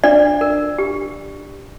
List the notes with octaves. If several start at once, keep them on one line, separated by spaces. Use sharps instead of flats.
D4 D5
A#4
G4